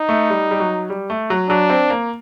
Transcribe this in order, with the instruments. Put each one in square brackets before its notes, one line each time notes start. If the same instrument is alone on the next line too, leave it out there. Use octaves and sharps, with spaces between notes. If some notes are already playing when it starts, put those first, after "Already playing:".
Already playing: [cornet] D#4
[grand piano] A3
G3
G3
F#3
G3
A3
F#3
[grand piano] F#3 [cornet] D4
[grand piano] C4
A#3